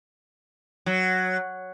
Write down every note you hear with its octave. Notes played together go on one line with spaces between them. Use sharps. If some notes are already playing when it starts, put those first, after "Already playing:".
F#3